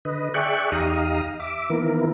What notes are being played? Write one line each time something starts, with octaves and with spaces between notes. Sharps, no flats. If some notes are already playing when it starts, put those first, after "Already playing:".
D3 B4 D#5
G#4 D5 E5 G5 C#6 F#6
E2 D#4 G4 F5 A#5 D#6
E5 D6
D#3 E3 A#3 B3 E4 A#4